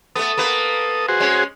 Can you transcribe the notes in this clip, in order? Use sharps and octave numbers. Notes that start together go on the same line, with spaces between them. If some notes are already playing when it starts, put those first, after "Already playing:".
A3 B3 A4 D#6
A#3 B3 B4
F#4 G#4 C5
G#3 C#4